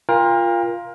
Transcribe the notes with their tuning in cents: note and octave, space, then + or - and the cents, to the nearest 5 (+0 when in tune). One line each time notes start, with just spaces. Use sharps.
F4 +0 A#4 +20 G5 +40